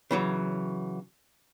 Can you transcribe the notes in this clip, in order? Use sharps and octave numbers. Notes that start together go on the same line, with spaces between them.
C#3 E3 F#3